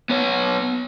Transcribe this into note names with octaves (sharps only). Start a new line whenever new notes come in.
B3 C#5